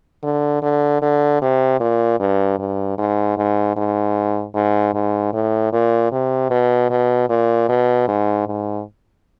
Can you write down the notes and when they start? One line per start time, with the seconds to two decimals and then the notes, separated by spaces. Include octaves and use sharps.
0.23 D3
0.62 D3
1.02 D3
1.42 C3
1.80 A#2
2.20 G2
2.59 G2
2.98 G#2
3.38 G#2
3.76 G#2
4.54 G#2
4.94 G#2
5.33 A2
5.72 A#2
6.12 C3
6.50 B2
6.90 B2
7.29 A#2
7.69 B2
8.08 G#2
8.47 G#2